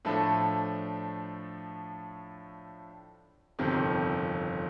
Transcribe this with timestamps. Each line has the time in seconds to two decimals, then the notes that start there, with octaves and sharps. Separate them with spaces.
0.05 A2 F3 A3 D4 A4
3.59 G1 F2 C3 D#3